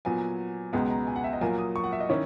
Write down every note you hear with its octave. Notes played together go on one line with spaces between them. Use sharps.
A#2 F#3 B3 G#5
C#2 B2 G#3 B3 A#5
A#5
G#5
F#5
E5
D#5
A#2 F#3 A#3 G#5
D#6
C#6
F#5
E5
D#5
D#3 C#4 E4 C#5